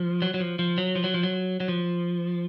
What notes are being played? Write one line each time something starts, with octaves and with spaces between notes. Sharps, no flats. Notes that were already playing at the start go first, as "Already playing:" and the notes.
Already playing: F3
F#3
F#3
F3
F3
F#3
F3
F#3
F3
F#3
F#3
F3